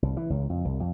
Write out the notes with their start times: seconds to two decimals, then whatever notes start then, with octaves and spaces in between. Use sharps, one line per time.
0.02 C2
0.17 E3
0.30 C#2
0.50 F2
0.65 C2
0.80 F2